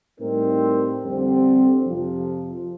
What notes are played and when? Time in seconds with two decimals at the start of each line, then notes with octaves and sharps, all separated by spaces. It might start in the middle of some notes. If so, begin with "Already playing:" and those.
0.19 A2 G3 C4 D#4 A#4
1.03 F2 D3 G3 C4 G4
1.86 F2 C3 F3